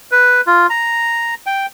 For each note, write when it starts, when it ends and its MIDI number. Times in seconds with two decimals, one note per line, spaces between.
0.11 0.41 71
0.47 0.67 65
0.70 1.34 82
1.46 1.66 79